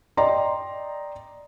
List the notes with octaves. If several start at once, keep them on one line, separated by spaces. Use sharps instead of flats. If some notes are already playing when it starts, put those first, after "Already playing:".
D5 D#5 G5 A#5 C6